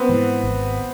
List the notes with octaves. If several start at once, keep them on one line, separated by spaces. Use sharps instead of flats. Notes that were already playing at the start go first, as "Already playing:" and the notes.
Already playing: B3 C4
G#2 E3
G#1